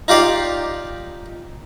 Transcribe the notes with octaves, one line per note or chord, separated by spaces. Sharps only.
D#4 F4 G4 D5 F5